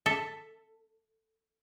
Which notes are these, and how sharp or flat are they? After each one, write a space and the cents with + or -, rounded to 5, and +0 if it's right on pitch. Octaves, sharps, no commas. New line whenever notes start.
A4 +10 E5 +0